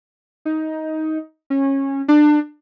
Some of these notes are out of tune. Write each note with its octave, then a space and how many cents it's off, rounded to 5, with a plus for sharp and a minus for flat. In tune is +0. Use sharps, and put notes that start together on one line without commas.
D#4 +15
C#4 -20
D4 +25